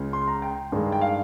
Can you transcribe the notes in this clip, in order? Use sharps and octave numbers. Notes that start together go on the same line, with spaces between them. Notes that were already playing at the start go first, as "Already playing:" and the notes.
Already playing: C#2 C#3 G#3
C6
A#5
G5
G2 D#3 G#3
G5
F5